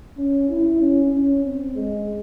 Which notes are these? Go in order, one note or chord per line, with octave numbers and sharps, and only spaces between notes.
C#4
E4
C#4
C#4
C4
G#3